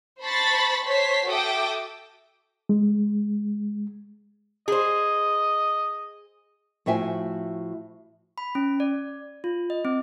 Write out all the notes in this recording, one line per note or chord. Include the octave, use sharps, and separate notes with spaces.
C5 A5 B5 C#6 A6 B6
C5 C#5 A5 C6 B6
F#4 A4 E5 G5 D6 D#6
G#3
G#4 C5 D#5
A2 F3 F#4 E5 G5 G#5
B5
C#4
D5
F4
D#5
C4